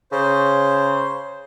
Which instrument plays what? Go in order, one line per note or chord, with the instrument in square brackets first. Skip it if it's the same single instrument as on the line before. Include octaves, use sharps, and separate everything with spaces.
[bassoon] C#3 [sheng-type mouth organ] C5